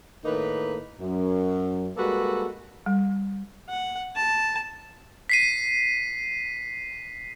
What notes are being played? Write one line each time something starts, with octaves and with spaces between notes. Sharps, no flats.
A2 D#3 A#3 D#4 B4
F#2
G3 G#3 A#3 F#4 A4 B4
G3
F#5
A5
B6 C7 D#7